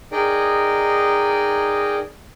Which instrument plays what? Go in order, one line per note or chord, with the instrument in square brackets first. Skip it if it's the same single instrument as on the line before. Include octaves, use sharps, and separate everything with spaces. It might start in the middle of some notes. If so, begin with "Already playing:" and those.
[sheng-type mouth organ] D#4 G#4 A#4 D5 D#5 G5